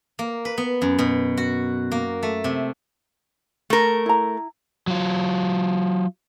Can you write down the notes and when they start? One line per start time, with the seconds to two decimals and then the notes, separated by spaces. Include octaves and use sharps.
0.19 A#3
0.45 B4
0.58 B3
0.82 F#2
0.99 B2
1.37 F#4
1.92 A#3
2.23 A3
2.44 C3
3.70 A3 A#4
4.06 E4 A#5
4.87 F#3 F4